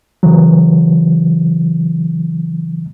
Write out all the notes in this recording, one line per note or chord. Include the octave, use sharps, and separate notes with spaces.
C#3 E3 F#3